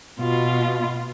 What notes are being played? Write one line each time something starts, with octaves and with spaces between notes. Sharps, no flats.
B2 F4